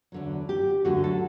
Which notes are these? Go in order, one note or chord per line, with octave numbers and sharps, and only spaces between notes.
E2 D3 F#3
G4
D2 D3 F#3 A3 F#4
A4